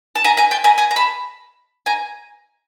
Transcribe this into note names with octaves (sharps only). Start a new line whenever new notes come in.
A5
G#5 A#5
G#5 A#5
G5 A5
G#5 A#5
G#5 A#5
A#5
A5 B5
G#5 A#5